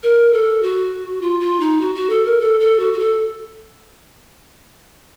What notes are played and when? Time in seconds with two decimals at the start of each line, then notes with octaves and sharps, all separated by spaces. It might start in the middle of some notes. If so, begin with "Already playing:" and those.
0.03 A#4
0.33 A4
0.62 F#4
1.21 F4
1.40 F4
1.60 D#4
1.81 F#4
1.95 F#4
2.10 A4
2.26 A#4
2.40 A4
2.60 A4
2.79 F#4
2.93 F#4
2.99 A4